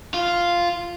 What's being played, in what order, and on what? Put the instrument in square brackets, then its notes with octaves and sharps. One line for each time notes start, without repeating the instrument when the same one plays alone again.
[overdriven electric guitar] F4